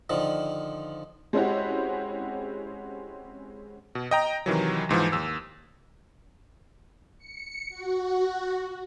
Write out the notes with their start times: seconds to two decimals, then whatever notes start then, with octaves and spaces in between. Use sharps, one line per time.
0.10 D3 D#3 F3
1.33 G#3 C4 C#4 E4 F#4 G4
3.95 B2
4.11 D#5 G5 A#5
4.46 C3 D#3 E3 F#3
4.89 D#2 G#2 E3 F3
5.12 D#2 E6
7.18 C#7
7.69 F#4